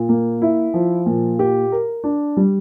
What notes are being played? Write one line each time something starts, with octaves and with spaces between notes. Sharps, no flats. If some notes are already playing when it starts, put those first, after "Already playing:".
Already playing: A#2
A#3
E4
F3
A#2
G4
A#4
D4
G3